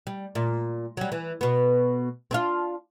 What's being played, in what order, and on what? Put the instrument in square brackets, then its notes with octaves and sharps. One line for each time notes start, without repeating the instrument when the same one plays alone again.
[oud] G3
A#2
F#3 G3
E3
B2 B3
C4 D4 F4